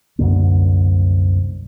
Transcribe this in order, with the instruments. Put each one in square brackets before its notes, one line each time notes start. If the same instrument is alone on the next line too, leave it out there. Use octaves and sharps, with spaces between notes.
[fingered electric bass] C2 F#2 D3 A#3